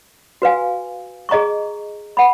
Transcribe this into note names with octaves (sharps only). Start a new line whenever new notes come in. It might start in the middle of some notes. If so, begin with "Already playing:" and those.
F#4 B4 F5 G#5
G#4 D#5 A#5 C#6
F#5 B5